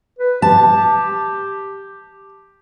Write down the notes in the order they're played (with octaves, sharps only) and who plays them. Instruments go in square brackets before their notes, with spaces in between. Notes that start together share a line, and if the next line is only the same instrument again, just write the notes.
[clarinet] B4
[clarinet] G4 [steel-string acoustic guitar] A5